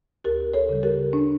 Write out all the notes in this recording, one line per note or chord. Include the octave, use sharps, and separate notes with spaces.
D2 G4 A#4
A4 C#5
C#3 G3
G4 A#4
D4